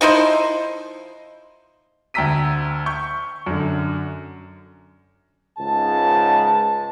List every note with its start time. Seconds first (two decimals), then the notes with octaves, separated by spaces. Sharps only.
0.01 F3 D#4 E4 C5
2.14 D2 G5 A#5 E6 B6 D#7
2.86 C#6 G6
3.46 F#2 D3
5.59 C#2 G#2 C#3 A5